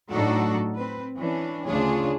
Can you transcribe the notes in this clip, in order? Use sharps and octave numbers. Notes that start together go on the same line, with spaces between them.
A2 F#3 D4 D#4 F#4 A4
C4 B4
E3 C#4 D4
D2 C#3 D4 F4 G#4 C#5